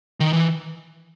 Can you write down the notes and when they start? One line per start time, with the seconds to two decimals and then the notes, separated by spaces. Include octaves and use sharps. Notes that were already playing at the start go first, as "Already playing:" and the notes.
0.20 D#3
0.33 E3